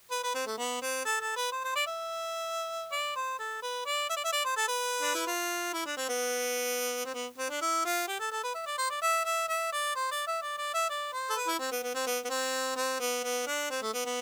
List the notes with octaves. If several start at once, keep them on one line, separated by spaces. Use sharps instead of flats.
B4
B4
C4
A3
B3
C4
A4
A4
B4
C5
C5
D5
E5
D5
C5
A4
B4
D5
E5
D5
E5
D5
C5
A4
B4
D4
E4
F4
E4
D4
C4
B3
C4
B3
C4
D4
E4
F4
G4
A4
A4
B4
E5
D5
C5
D5
E5
E5
E5
D5
C5
D5
E5
D5
D5
E5
D5
C5
A4
B4
E4
C4
B3
B3
C4
B3
B3
C4
C4
B3
B3
D4
C4
A3
B3
B3